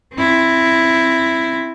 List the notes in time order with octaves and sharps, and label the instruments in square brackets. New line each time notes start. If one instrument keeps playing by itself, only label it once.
[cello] C4 E4